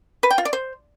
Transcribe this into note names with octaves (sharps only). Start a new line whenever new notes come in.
B4
G5
F4
D5
C5